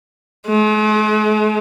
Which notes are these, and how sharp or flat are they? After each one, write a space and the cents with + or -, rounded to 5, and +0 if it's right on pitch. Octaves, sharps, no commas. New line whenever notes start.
G#3 +45